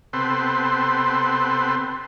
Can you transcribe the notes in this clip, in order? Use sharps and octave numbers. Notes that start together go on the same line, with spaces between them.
C3 B3 C4 A4 B4 C6